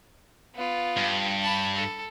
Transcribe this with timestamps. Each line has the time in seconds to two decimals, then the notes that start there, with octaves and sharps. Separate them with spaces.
0.55 B3 F4
0.97 G2
1.42 A5 B5
1.76 A4